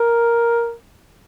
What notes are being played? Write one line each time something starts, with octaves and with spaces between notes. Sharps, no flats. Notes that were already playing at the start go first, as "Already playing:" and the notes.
Already playing: A#4